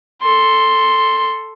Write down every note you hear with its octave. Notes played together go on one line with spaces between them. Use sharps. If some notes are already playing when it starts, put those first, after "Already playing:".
A4 C6